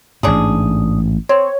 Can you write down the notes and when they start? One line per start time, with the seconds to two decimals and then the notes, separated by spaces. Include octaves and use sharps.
0.23 A1 G#2 D4 G#4
1.29 C4 C#5